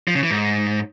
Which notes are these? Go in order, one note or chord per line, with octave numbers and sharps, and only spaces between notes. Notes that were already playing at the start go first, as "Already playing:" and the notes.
F3
C#3
E3
G#2